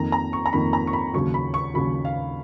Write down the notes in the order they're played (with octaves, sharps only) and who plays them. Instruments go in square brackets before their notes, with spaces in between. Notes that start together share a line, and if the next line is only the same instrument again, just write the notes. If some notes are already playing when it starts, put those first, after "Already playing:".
Already playing: [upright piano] F2 D#3 A#3 A#5
A#5
C#6
A#5
F2 D#3 A#3 B5
A#5
C#6
B5
D#2 C#3 F#3 C#6
B5
C#6
D#2 C#3 F#3 B5
F5